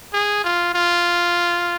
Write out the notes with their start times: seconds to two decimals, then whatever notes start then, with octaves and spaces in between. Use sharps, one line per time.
0.13 G#4
0.44 F4
0.74 F4